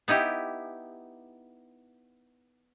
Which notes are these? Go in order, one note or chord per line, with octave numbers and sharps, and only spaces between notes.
B3 D#4 E4 G4